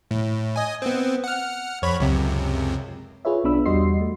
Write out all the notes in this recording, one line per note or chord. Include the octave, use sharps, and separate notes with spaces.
A2
D#5 G#5
B3 C4
F#5 F6
F2 C#5 B5
C#2 F#2 C3
F4 G#4 B4 C#5 E5
B1 B3 D4 B5 E6
E2 G3 F#4 D#5 C6 C7
A3